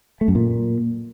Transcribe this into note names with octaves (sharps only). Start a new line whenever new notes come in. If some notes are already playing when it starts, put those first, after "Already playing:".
A3
F#2
A#2